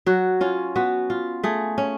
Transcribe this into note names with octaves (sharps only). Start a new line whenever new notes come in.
F#3 F#4
C#4 F4
B3 F#4
F4
A3 G#4
C#4